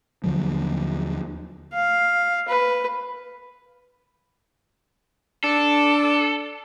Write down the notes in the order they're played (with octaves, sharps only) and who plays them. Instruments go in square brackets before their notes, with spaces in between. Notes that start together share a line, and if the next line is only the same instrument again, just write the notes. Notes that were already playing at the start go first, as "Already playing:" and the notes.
[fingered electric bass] D#2 D3 F3 F#3
[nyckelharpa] F5
B4
[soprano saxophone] D4 [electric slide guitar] A4